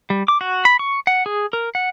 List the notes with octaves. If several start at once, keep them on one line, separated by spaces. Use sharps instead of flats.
G3
D6
F#4
B5
C#6
F#5
G#4
A#4
F#5